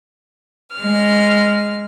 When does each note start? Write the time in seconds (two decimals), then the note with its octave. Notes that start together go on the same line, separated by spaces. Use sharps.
0.77 G#3 F6